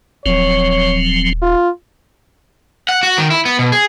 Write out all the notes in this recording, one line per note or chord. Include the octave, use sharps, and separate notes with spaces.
D#1 F3 F#3 C4 C#5
F4
F#5
F#4
D#3
E4
B3
B2
G#4